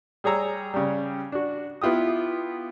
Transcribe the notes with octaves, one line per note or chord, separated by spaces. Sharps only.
G3 G#4 C#5 A#5 E6
C#3 G3
D4 F#4
B3 E4 F4 G4 D#6